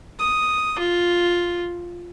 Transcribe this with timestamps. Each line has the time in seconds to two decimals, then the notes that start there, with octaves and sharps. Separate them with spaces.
0.19 D#6
0.79 F4